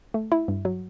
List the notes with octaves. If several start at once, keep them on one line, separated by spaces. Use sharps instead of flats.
A3
E4
G2
F#3